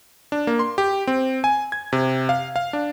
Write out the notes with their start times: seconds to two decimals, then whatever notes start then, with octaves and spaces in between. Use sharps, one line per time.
0.32 D4
0.47 A#3
0.59 C6
0.78 G4
1.07 C4
1.44 G#5
1.72 G#6
1.93 C3
2.29 F5
2.56 F5
2.73 D4